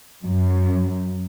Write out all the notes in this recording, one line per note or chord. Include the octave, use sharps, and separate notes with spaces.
F#2